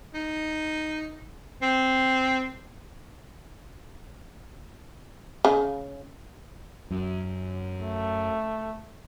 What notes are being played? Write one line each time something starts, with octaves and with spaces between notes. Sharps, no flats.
D#4
C4
C#3
F#2
A3